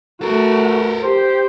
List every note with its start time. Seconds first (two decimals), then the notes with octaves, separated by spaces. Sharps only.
0.22 A3 F#4 A4 A#4
1.03 G4 C5